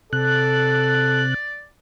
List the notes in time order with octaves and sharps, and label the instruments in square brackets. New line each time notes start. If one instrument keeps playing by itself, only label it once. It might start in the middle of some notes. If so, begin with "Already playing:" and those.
[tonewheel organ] C3 F#6 [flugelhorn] A4 [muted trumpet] D5